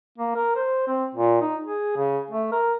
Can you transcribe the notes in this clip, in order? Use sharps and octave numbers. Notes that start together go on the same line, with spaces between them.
A#3
A#4
C5
C4
A#2
D#4
G#4
C#3
A3
A#4